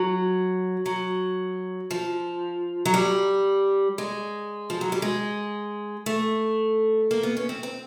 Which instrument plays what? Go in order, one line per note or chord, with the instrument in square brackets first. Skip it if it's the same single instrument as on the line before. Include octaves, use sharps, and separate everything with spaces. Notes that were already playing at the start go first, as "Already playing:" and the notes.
Already playing: [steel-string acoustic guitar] F#3
F#3
F3
F#3
G3
G#3
F3
F#3
G3
G#3
A3
A#3
B3
C#4
C4
C4